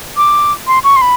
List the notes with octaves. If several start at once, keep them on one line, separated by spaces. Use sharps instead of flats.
D6
C6
C#6
C6
B5